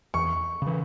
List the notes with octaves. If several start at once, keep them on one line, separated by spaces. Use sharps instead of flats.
E2 C#6
C#3 E3